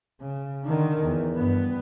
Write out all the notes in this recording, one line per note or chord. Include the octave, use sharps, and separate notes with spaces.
C#3
D3 D#3
E2
G2 B3